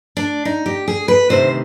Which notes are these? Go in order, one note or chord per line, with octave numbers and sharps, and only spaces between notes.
D4
D#4
G4
G#4
B4
D2 C3 D#3 C5